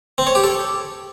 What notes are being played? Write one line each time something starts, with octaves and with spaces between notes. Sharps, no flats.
C4
C#5
G4
A4